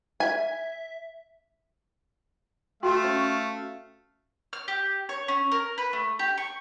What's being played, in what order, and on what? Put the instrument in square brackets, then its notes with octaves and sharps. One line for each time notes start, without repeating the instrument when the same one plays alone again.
[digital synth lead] E5 [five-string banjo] G#5
[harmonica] A3 F5 [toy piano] F#4 G5 C6
[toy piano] C#4 C5 C#6
[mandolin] F6
G4
C#5
C#4
A#4
B4
A3
G4
C#6